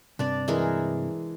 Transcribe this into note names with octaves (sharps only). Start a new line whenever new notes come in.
G2 C3 D4 D5
E3 G#3 A#4